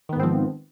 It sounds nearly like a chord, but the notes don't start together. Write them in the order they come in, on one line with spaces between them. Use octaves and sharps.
D#3 B3 G#2 C4 F3